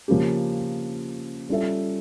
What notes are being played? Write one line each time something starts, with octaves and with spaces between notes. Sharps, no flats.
C#3 F3 A#3 C#4 G4
G3 C#4 F4 A4 E5